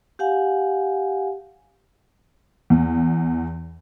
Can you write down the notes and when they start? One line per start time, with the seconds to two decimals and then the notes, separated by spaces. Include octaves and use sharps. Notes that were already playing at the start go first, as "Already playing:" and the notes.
0.19 G4 F5 F#5 G#5
2.70 E2